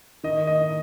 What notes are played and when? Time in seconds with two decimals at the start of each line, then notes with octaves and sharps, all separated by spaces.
0.24 D#3 D#5
0.47 D#5